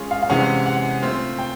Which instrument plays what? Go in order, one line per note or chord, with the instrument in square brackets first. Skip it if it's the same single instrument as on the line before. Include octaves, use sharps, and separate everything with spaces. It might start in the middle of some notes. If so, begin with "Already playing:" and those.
Already playing: [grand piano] G#3 C#4 F4 G#4 C#5
[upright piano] F5
F5
[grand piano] C3 E3 G#3 C#4 [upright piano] F#5
[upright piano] F#5
[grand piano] A3 C4 F4
[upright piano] G5